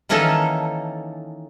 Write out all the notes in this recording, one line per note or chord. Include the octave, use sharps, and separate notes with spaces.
D#3 E3 A#3 C#4 D#4 A4